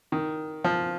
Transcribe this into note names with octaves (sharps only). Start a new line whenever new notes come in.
D#3
F3